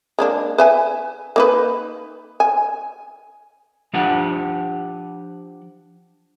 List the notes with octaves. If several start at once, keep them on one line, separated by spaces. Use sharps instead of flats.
G#3 A#3 D4
B4 E5 G#5
A#3 D#4 B4
G#5
F3 D4 G4 F#5 A5